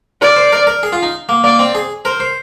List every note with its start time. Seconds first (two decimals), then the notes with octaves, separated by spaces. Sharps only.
0.21 A#4 D5
0.36 C5
0.52 A#4
0.67 A#4
0.83 G#4
0.93 F4
1.03 D#4
1.29 A#3
1.44 A#3 D5
1.59 C4
1.75 G#4
2.05 A#4 C5
2.20 C5